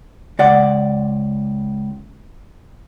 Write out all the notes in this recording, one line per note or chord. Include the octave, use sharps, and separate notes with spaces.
C#2 D5 F#5